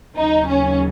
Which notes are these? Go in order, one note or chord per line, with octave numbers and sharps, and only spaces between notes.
D#2 C#3 F#3 D#4
C#4